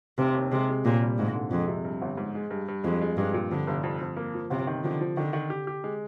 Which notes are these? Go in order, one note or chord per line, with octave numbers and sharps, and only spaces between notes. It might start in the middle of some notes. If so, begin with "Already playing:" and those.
F1 C3
D#2
C3 G#3
G#3
D#2 A#2
G3
G#1 G#2
D3
F2 G#3
C3
G2
G1
G#2
G#3
G2
G2
F2 G#3
G#3
G2 G#3
A#2
F2 D3
F1
F2
F2
A#3
F3
G1 C3
D#3
D3 F3
F3
D3 D#3
D#3
G4
G4
G#3